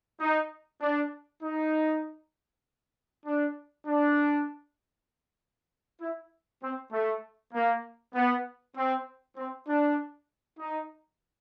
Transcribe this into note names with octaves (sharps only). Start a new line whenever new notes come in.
D#4
D4
D#4
D4
D4
E4
C4
A3
A#3
B3
C4
C4
D4
D#4